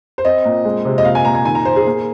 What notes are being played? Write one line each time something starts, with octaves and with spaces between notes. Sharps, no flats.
C5
C4 D#5
A#2
G#3
C3
D#5
A#2 F5
G#5
A#2 A#5
G#5
D#3 G#5
A#5
A#3 C5
G#4
A#3